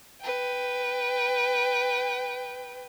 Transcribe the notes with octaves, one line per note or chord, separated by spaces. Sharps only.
B4 G5